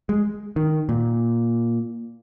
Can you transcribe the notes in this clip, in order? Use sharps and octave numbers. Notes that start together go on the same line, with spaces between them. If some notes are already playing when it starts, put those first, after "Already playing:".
G#3
D#3
A#2